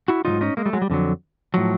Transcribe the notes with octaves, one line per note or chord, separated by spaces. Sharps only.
E4 F#4
G#2 D#3 F#3 D#4 F4
C#4 D#4
G#3 A#3
G3 A3
F#3 G#3
G3
F2 D3 F#3
A2 F3 F#3